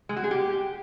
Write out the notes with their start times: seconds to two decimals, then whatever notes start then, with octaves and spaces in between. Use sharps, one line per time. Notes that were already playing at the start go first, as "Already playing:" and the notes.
0.09 G#3
0.16 F#4
0.24 G#4
0.31 G4